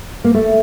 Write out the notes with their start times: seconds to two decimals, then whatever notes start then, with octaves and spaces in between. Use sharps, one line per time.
0.24 A#3
0.34 A3